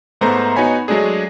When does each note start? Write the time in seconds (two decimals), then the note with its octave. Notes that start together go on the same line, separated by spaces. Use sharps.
0.21 G#2 A3 B3 C5 A#5
0.56 B3 D#4 F#4 C#5 G#5 B5
0.88 F#3 G#3 A3 D4 G#4